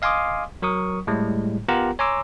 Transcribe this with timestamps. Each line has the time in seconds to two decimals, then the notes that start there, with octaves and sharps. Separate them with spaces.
0.02 D#5 F5 G#5 C6 D6 D#6
0.62 F#3 A#4 C#6 D#6
1.07 A2 G3 G#3
1.68 B3 F4 G4 A#4 F#5 A#5
1.99 C#5 G#5 A#5 C6 D6 E6